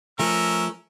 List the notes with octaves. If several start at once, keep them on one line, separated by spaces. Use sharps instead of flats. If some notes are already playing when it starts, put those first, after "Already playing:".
F3 A3 C#4 A#4 E6